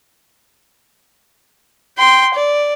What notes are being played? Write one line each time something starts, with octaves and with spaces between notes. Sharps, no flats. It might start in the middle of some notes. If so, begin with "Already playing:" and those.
G5 C6
D5